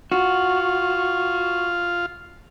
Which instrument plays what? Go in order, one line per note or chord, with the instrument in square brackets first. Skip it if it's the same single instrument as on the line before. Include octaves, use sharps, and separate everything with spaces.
[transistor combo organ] F4 [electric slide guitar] F#4